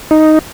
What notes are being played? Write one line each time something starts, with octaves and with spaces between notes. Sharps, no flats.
D#4